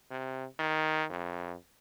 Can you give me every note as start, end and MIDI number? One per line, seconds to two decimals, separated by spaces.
0.11 0.45 48
0.59 1.04 51
1.10 1.55 41